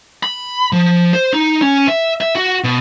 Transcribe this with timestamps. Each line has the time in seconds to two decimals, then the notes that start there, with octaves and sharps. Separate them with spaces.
0.23 B5
0.72 F3
1.14 C5
1.33 D#4
1.62 C#4
1.88 E5
2.21 E5
2.35 F#4
2.64 B2